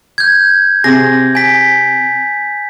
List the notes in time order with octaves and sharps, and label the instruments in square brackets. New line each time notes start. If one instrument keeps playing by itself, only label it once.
[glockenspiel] G6 G#6
[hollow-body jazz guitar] C3 G#4 [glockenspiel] A#6
[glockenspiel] G#5 B6